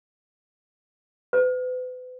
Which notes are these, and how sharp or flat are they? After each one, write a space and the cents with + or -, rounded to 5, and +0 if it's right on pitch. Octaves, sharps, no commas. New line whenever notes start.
B4 +40